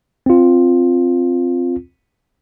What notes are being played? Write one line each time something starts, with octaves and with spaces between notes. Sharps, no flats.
C4 F4